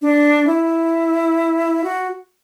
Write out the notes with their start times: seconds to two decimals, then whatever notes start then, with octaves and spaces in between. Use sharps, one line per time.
0.02 D4
0.47 E4
1.84 F#4